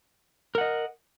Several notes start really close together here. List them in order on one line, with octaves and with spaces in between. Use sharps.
A#4 F#5 D#5